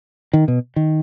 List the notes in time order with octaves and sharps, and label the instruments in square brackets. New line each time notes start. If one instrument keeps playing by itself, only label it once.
[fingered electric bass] D#3
B2
D#3